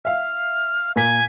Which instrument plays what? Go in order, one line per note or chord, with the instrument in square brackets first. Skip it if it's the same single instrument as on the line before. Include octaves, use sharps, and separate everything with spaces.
[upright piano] E5 F5 [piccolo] F6
[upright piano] A#2 A#4 B6 [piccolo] G#5